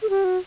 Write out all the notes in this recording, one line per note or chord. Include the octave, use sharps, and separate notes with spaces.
A4
G4
F#4